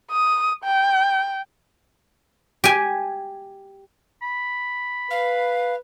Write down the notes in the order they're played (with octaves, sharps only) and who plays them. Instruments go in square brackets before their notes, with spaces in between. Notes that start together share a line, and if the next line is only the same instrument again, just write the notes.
[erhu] D#6
G5
[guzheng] G4 G#5
[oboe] B5
[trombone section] B4 [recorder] F5